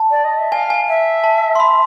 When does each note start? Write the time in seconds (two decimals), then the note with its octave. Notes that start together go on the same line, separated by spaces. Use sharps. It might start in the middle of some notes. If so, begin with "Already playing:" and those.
Already playing: A5
0.11 D5
0.25 D#5
0.38 E5
0.52 F5 G#5
0.70 G#5
0.89 E5
1.24 A5
1.55 C6
1.60 B5